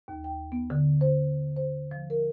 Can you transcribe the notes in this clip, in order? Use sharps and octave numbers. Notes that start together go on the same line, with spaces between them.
D#2
G5
B3
D3
C5
C5
F3
A#4